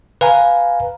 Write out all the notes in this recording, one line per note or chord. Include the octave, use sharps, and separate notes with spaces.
B4 F5 G#5 A#5